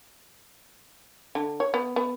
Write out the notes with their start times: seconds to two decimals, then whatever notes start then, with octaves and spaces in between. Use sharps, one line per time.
1.35 D3
1.60 C#5
1.74 B3
1.96 B3